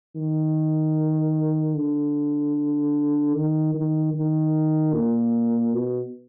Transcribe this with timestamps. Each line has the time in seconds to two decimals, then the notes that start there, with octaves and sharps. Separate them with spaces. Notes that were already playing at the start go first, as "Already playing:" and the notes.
0.16 D#3
1.75 D3
3.34 D#3
3.74 D#3
4.14 D#3
4.94 A#2
5.73 B2